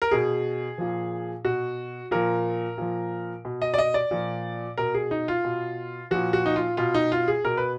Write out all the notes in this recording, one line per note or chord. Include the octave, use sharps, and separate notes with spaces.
A#4
B2 G#4
A#2 F3
B2 F#4
A#2 F3 A#4
A#2 F3
B2
D#5
D5
D#5
D5
A#2 F3
B2 A#4
G#4
D#4
F4
B2
A#2 F3 F#4
F#4
D#4
F4
B2 F4
D#4
F4
G#4
B2 A#4
B4